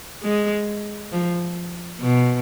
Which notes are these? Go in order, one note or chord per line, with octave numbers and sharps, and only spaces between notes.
G#3
F3
B2